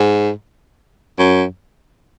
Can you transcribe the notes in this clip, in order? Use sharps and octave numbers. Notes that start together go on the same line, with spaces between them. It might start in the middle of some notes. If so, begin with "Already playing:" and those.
Already playing: G#2
F#2